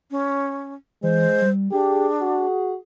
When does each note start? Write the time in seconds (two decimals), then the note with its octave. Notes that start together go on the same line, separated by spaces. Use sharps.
0.11 C#4
1.03 E3 G#3 C5
1.42 G3
1.72 D4 G4 G#4
2.21 F#4